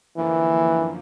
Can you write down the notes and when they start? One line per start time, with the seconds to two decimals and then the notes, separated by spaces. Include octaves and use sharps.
0.17 F#2 D3 E3 F3 A#3